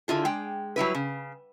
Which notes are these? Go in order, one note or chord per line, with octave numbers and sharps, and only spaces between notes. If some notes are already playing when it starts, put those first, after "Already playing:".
D3 E4 F4 G#4
G#3 G5
F#3 G3 E4 B4
C#3